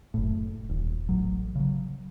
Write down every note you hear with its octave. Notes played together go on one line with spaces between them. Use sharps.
F#1 A2
D#1
A1 F#3
C#3 F#3